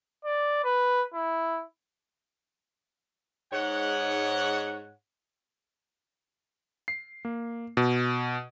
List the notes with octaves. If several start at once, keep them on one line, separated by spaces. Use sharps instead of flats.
D5
B4
E4
G#2 C#5 F#5
C7
A#3
B2